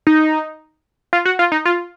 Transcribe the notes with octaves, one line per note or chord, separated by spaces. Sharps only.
D#4
F4
F#4
F4
D#4
F4